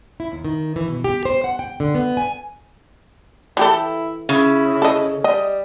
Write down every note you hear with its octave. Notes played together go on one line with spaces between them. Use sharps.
E4
D#2
D#3
E3
B2
G4
C5
F#5
G5
D3
B3
G#5
E3 E4 G4 A4
C#3 E4
A4 D#5
G3 D#5